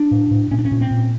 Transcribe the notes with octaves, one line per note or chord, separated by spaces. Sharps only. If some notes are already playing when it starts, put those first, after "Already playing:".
Already playing: D4
A2
A2
A#2 C#4
D4
C#4
A#2
C4
A#2